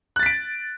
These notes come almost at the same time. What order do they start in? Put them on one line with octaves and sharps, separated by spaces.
F#6 A6 B6 D7